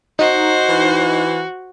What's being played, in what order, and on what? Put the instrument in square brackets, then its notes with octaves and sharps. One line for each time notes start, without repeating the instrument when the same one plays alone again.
[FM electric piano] D#4 [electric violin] F#4 [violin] C5
[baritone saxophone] E3